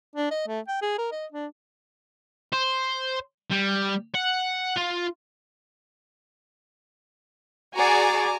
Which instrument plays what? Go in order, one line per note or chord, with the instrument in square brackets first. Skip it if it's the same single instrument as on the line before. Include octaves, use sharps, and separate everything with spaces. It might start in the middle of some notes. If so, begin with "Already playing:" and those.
[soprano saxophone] D4
D#5
A3
G5
G#4
A#4
D#5
D4
[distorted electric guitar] C5
G3
F#5
F4
[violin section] F#4 G#4 D5 [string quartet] G#5 A#5 D6